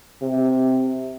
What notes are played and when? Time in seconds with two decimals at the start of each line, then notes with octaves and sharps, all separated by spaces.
0.22 C3